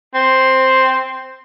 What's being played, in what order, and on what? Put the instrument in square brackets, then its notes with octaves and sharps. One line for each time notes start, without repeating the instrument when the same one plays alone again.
[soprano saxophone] C4